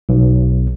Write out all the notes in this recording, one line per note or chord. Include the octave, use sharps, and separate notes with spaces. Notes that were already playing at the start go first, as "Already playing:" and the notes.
B1